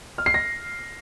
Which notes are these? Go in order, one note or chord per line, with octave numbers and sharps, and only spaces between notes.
F6
C7
A#6